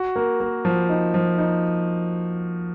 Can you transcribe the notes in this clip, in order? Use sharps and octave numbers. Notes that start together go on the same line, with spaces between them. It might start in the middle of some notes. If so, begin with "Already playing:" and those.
Already playing: F#4
A#3
A#3
F3
D#4
F3
D#4